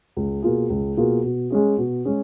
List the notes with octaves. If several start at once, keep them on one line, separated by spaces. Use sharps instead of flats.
C#2
B2 A#3 F4 G#4
C#2
B2 A#3 F4 G#4
B2
G#3 C#4 G#4
B2
G#3 C#4 G#4